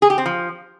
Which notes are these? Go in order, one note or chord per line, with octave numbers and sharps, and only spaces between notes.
G#4
G4
C4
F3